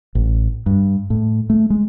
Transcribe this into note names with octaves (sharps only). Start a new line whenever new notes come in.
A1
G2
A2
A3
G#3